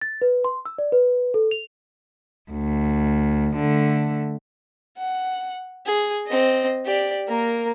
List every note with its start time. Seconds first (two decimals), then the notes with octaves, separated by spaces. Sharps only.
0.02 A6
0.22 B4
0.45 C6
0.66 E6
0.78 D5
0.92 B4
1.34 A4
1.51 F7
2.52 D2
3.56 D3 A3
4.97 F#5
5.86 G#4
6.26 C4 D#5
6.85 G4 D5
7.28 A#3 A#4